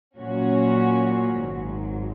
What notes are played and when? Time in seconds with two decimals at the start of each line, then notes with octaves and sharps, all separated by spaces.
0.16 A#2 F#3 A#3 C#4 F#4
1.35 G#1 G#2 F#3